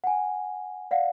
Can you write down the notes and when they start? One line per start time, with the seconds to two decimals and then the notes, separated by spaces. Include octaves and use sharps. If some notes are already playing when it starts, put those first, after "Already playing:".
0.04 F#5 G#5
0.91 D5 F5 F#5